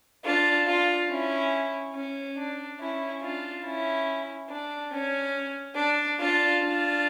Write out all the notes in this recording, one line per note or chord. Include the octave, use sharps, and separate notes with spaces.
D4 F4
D4 F4
C#4 E4
C#4
D4
C#4 E4
D4 F4
C#4 E4
D4
C#4
D4
D4 F4
D4 F4